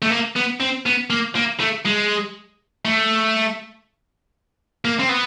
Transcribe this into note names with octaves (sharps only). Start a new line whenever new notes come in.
A3
A#3
B3
C4
B3
A#3
A#3
A3
G#3
A3
A#3
C4
B3